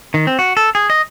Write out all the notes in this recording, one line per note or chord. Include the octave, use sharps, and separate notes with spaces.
D#3
C4
F#4
A4
G#4
D#5